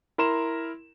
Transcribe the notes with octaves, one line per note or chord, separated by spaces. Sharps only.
E4 A#4 A#5 C6 E7